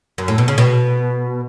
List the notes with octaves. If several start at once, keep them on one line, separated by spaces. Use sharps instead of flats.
F#2
A2
B2
C#3
B2